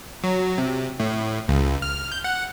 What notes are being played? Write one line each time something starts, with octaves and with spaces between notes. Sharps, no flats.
F#3
C3
A2
C#2
F6
G6
F#5